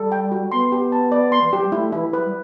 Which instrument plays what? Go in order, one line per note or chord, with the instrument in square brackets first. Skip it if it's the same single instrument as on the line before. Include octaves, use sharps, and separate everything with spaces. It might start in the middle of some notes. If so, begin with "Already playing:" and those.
Already playing: [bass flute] G3 [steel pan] A4
[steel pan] G5
F#4
[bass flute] B3 [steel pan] C6
[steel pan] G4
A5
D5
C6
[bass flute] E3
[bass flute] F#3 [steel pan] G4
[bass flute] G3
[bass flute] A3 [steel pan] E4
[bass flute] E3 [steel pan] E4
[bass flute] E3
[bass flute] F#3 [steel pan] B4
[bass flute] G3